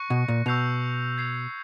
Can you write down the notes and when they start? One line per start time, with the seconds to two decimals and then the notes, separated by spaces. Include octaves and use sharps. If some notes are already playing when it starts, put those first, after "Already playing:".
Already playing: C#6 F#6 A#6 C#7
0.10 B2
0.28 A#2
0.46 B2 C#6 E6 G6 C7 F7
1.18 G#6 C7 F7